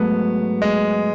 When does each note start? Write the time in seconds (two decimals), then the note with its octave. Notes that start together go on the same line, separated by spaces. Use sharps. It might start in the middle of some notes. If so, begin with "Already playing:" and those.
Already playing: G#2 F#3 A3 B3
0.62 G#3